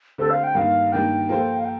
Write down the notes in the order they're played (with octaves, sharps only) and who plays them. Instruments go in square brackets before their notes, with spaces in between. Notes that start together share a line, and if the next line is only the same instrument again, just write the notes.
[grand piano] D3 A3 C4 G4 C5 [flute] A4
[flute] F5
G5
[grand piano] G2 D#3 A#3 [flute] F5
[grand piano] G2 D#3 A#3 D4 [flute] G5
[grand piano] F3 A#3 F4 A4 C5
[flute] F5
G5